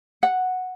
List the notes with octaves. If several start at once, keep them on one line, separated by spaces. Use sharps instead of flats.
F#5